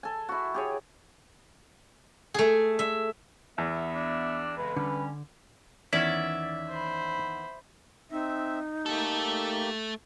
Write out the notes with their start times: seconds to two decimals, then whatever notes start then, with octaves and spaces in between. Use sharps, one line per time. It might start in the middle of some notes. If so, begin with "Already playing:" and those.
0.03 A4 G#5
0.29 E4 F#4
0.54 G4 G#4 C#5
2.34 A3 G#4
2.79 E5
3.58 E2 B3 E5
3.94 D4
4.57 F2 C#3 G#3 B4
4.76 D3 G3 C#4
5.93 E2 D#3 C#4 E4 D5 E5
6.70 C5 B5
8.11 C4 D#4 E5
8.86 A3 A#3 G4 A4